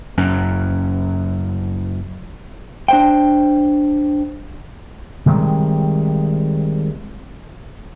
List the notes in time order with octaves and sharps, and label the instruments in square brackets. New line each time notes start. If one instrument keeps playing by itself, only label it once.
[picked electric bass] F#1 F#2 C#4
[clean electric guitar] D4 C5 G5
[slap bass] C3 D#3 G3 G#3